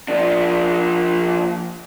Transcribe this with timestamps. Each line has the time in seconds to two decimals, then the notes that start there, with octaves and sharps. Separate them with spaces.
0.08 F3 D4